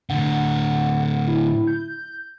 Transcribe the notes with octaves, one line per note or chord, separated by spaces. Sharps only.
A2 D3 F#5
E4
G6